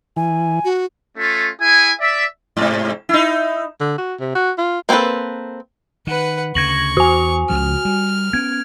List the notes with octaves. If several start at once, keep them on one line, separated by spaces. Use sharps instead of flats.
E3 G#5
F#4
A3 C#4 F4
E4 G#4 G#5
D5 E5
G#2 C3
D#4 E4
D3
F#4
C3
F#4
F4
A#3 C4 F4 A4 B4
D#3 B4 F#5
D2 C#3 C#6 G#6 A#6 F#7
E2 F#4 G#5
C#2 C#3 F3 F6
G3
B3 C#4 G#6